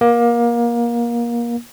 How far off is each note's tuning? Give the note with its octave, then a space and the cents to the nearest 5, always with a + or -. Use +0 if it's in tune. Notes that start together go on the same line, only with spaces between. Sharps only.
A#3 +25